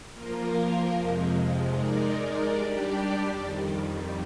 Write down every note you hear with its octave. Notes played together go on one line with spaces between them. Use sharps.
F3 A#3 F4 A#4
F2 C3 F3 G#3
G#3 D#4 A#4 D5
G3 D4 G4 D5
F2 D#3 G3